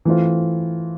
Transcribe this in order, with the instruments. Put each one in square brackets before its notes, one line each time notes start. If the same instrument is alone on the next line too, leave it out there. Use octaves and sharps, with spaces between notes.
[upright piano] E3 A3 C4 F4